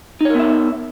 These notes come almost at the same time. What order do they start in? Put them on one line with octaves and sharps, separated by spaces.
D#4 C#5 A#4 B3 E5